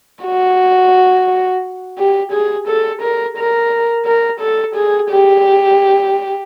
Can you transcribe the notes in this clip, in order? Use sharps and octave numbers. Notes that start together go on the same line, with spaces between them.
F#4
G4
G#4
A4
A#4
A#4
A#4
A4
G#4
G4